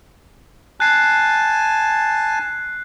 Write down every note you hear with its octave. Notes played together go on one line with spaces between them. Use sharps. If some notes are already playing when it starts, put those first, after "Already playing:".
G#5 A5 F#6 C7